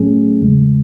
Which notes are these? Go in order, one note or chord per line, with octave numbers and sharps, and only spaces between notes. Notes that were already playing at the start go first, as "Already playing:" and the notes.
Already playing: A2 F#3 A3 C#4 G#4
E2 C#3 G#3